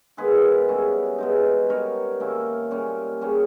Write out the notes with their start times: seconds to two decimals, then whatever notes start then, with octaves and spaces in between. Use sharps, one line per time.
0.17 D#3 G#3 B3 G#4 B4
0.68 C#3 G3 C#4 E4
1.18 B2 G#3 D#4
1.69 G3 B3 D#4 A#4 C#5
2.20 D#3 A#3 C#4 E4
2.71 A#2 G3 C#4
3.21 C#3 G3 C#4